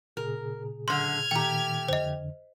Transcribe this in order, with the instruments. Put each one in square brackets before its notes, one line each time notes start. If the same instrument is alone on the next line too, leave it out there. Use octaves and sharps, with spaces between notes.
[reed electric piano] A#2 C#3 G#4 [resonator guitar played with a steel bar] A#4
[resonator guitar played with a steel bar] F#2 D3 [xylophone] C6 [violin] F6 G#6
[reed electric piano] A#2 D#3 [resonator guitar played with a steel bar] A3 G4 [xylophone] G5 A#5
[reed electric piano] F2 D3 [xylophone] C5 D#5